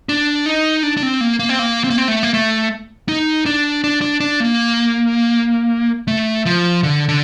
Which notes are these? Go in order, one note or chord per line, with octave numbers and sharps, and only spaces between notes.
D4
D#4
D4
D4
C4
A#3
A#3
C4
A#3
C4
A#3
C4
A3
A#3
A3
D#4
D4
D4
D4
D4
A#3
A3
F3
D3
D3